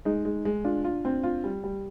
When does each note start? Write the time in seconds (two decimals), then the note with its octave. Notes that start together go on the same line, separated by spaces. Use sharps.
0.05 G#3 D#4
0.25 G#3
0.45 G#3
0.64 D4 F4
0.84 F4
1.05 C4
1.23 F4
1.44 G3
1.64 G3